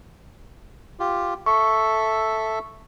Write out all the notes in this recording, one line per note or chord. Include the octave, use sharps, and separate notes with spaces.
F4 G4
A4 E5 C#6